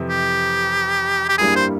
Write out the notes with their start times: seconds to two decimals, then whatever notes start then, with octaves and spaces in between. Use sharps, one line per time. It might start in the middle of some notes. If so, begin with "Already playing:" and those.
Already playing: F2 C3 E3
0.09 G4
1.29 G4
1.38 G2 G3 A#3 E4 G#4
1.56 C5